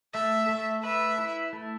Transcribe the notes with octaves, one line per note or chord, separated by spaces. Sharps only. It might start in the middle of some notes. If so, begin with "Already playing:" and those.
A3 E5
A3
B4 E5
E4
A3